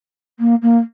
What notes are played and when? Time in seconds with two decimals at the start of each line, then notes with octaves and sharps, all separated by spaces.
0.39 A#3
0.62 A#3